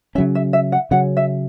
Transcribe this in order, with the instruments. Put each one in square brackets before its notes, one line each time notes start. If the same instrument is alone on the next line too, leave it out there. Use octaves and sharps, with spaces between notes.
[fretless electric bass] C#4 [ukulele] E5
[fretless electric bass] C#3 F#3
[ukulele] E5
E5
F#5
[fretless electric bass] C#3 F#3 C#4 [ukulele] F#5
[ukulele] E5